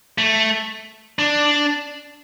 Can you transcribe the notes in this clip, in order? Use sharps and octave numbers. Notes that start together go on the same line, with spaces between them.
A3
D4